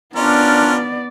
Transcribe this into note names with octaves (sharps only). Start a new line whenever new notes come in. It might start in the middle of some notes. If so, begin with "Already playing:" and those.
B3 C#4 D4 F4 A#4 D5